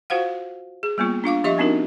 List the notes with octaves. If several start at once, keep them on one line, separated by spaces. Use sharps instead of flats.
F4 F#4 C5 F5 F#5
G#4
G3 A#3 B3 F4
D4 F4 F5 D6
F3 G4 D#5 E5 C#6
B3 C4 D4 D#4 F#4 A#4